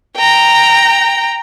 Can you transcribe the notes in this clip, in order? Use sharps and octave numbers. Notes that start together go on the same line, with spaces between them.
G5 A#5